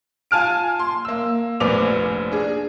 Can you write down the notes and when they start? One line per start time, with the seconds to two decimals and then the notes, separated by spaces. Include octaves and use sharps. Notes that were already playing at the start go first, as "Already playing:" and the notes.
0.31 F4 G#5 A5 F6 D7
0.79 C6
1.05 A#3 E6
1.60 F1 A#1 B3 C5 D6 F7
2.32 D4 G#4